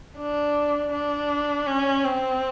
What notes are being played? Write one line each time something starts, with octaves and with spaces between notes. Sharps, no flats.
D4
D4
C#4
C4